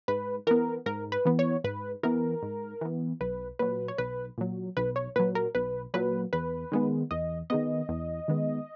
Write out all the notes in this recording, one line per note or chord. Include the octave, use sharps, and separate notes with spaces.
G#2 B4
E3 B3 A#4
G#2 A#4
B4
E3 B3
C#5
G#2 B4
E3 B3 A#4
G#2
E3 B3
B1 B4
A#2 F#3 B4
C#5
B1 B4
A#2 F#3
B1 B4
C#5
A#2 F#3 B4
A#4
B1 B4
A#2 F#3 B4
E2 B4
D#3 G#3 B3
E2 D#5
D#3 G#3 B3 D#5
E2
D#3 G#3 B3